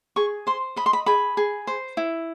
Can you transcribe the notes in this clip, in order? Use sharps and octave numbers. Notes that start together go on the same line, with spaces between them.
G#4 C#6
C5 C6
D#5 B5
C6
B5
G#4 B5
G#4
C5
E4